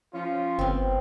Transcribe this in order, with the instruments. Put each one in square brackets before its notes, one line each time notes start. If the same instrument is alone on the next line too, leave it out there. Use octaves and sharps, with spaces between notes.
[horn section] F3 C#4 F4
[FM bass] G1 [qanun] B3 C4